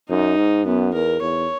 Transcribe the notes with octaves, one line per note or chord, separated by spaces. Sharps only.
F#2 D#4
G#2
F#2 B3
E2 A#4
E2 C#5